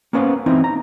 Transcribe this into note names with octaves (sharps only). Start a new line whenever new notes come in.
A#3 B3 C#4 C5 F5
E3 C4 D#4 E4
A#5